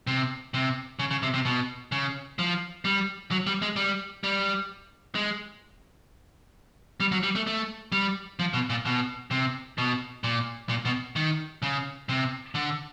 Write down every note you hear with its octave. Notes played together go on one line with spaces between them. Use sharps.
C3
C3
C#3
C#3
C3
C3
B2
C#3
F3
G3
F#3
G3
G#3
G3
G3
G#3
G3
F#3
G3
A3
A3
G3
F3
B2
A#2
B2
C3
B2
A#2
A#2
B2
D#3
C#3
C3
D3